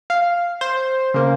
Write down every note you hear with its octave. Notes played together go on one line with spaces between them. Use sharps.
F5
C5
C#3 A#3